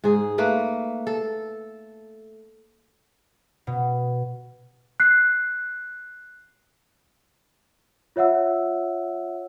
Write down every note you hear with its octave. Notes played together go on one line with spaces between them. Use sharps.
G#2 G#4
A3 A#3 B4
A4
B2
F#6 C7
F4 C#5 E5 F#5 E6